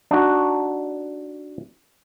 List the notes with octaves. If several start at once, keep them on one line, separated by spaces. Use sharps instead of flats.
D4 D#4 F#4